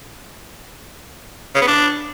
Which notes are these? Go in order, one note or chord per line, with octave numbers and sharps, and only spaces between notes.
C#3
B3
D4